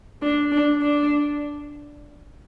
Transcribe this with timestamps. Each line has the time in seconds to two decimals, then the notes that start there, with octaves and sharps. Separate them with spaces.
0.22 D4
0.51 D4
0.81 D4